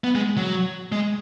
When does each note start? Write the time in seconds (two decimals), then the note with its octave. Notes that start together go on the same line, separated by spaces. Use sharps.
0.04 B3
0.15 G#3
0.37 F#3
0.92 G#3